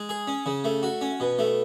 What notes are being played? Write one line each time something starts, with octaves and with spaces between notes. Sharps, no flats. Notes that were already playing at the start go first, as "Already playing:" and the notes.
Already playing: G#3
G#4
C#4
C#3
A3
F#4
C#4
B2
A3